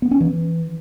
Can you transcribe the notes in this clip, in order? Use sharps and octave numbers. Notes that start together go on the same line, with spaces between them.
B3
C#4
E3